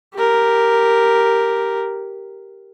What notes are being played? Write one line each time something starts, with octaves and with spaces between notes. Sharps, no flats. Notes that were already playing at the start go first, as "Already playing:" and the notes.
G4 A#4